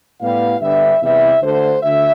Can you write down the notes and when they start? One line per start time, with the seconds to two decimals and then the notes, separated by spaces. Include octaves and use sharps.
0.21 A2 G3 B3 F5
0.61 G2 D3 G3 B3 E5
1.02 E2 C3 E3 G3 E5
1.42 D2 D3 A3 C5
1.83 D2 D3 E5